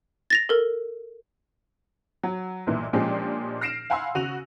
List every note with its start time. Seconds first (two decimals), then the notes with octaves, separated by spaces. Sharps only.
0.30 A6 A#6 F7
0.49 A4 A#4
2.23 F#3
2.67 B1 G2 A#2 E3
2.93 A#2 F3 G#3 C#4 D4 G4
3.61 F6 A#6 C7 D7 E7
3.90 F5 F#5 G#5 B5 C6 E6
4.15 C#3 F#4 D#7 F7